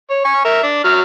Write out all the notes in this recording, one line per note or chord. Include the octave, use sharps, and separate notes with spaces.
C#5
G#5 C#6
A#4 E5
D4
F#3 F6